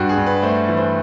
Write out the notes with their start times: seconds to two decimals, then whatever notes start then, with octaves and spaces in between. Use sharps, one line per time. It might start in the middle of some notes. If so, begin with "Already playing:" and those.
Already playing: G2 F#4
0.09 G#4
0.17 G2
0.26 B4
0.43 A3 C5
0.68 E3
0.77 C5